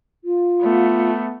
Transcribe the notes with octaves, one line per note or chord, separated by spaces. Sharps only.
F4
A3 B3